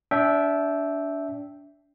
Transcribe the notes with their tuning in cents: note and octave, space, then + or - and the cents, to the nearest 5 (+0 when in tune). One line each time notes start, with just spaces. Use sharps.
D4 -30 E5 -5 G5 +0